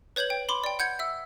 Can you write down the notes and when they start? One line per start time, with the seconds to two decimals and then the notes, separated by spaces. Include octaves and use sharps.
0.16 B4 C#5 G6 G#6 F#7
0.30 G5
0.49 B5 C6 D6
0.64 D5 G5
0.79 F#5 G6 G#6 C#7
0.99 E5 E6